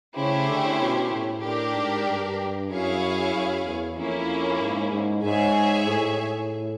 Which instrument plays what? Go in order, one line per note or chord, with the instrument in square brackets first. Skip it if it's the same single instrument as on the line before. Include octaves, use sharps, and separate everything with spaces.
[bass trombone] C#3 [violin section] A3 C#4 E4 G4 C5
[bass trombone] D3
B2
A2
[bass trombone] A2 [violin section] D4 G4 A#4
[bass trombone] G#2
G2
[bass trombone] F#2 [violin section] E4 G#4 C#5 F5
[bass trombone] F#2
E2
[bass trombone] F2 [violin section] A#3 C#4 E4
[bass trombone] G#2
G#2
[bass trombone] G#2 [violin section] G#4 C#5 E5 G#5
[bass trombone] A2